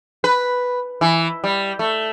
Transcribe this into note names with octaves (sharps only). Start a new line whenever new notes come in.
B4
E3
G3
A3